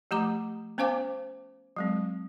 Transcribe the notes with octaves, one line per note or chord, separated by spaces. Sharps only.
F3 A3 G4 A#5 D6
B3 C#4 C5 F5 G#5 D6
F#3 G#3 C4